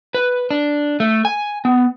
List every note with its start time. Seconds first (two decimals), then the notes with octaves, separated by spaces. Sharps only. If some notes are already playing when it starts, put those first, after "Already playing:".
0.15 B4
0.51 D4
1.00 A3
1.25 G#5
1.65 B3